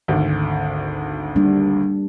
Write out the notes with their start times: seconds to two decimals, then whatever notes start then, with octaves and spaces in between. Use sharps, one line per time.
0.08 G#1 D2
1.36 G3 A#3 D4